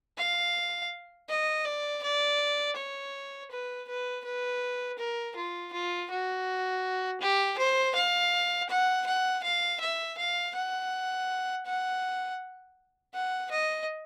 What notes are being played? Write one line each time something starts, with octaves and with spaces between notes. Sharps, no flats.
F5
D#5
D5
D5
C#5
B4
B4
B4
A#4
F4
F4
F#4
G4
C5
F5
F#5
F#5
F5
E5
F5
F#5
F#5
F#5
D#5